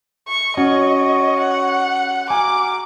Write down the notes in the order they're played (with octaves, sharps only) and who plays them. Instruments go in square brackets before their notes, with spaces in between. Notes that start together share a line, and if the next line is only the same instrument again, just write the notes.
[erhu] C#6
[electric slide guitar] C#4 F#4 [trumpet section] C#5 C#6 [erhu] D#5
[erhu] F#5
[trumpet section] F#4 F5 A#5 [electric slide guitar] G#5 [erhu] D6